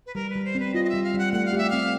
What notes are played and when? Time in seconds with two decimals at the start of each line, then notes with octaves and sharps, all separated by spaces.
0.06 B4
0.15 G3 A#4
0.30 B4
0.36 G3
0.45 C5
0.55 C4 B4
0.74 F4 D#5
0.85 D#5
0.89 G3 E5
1.04 F5
1.14 G3 F#5
1.33 A3 F#5
1.45 F5
1.53 G4
1.58 E5
1.70 C4 F5